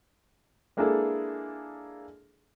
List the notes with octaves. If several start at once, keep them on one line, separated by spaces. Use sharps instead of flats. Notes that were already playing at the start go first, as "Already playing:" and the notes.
G#3 A#3 D4 E4 G#4 A4